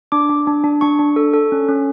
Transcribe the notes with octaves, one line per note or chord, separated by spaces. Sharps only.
D4 D6
D4
D4
D4
D4 C#6
D4
A4
A4
C#4
C#4